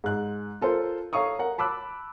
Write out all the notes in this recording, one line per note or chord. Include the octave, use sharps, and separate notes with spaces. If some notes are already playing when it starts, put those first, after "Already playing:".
G#2 F#6
F4 A4 A#4 C5
A4 C#5 F5 A#5 C#6 D#6
A#4 F#5
A5 B5 D6 E6 F#6